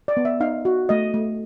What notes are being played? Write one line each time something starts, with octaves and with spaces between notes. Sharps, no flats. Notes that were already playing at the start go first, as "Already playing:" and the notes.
D5
B3
E5
D#4 F5
F#4
A3 D#5
A3